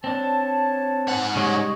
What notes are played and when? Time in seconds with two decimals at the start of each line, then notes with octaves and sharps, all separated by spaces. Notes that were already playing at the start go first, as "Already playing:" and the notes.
0.04 C4 D4 C#5 A5
1.08 G#2 F#5
1.36 C#3 G3 G#3 C#5 D#5 C#6